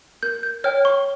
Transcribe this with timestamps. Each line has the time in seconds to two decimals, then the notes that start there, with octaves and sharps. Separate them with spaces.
0.23 A#4 G6
0.43 G6
0.64 C#5 G5 F6
0.85 C#6